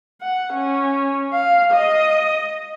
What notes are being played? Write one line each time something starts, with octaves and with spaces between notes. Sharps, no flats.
F#5
C#4
F5
D#5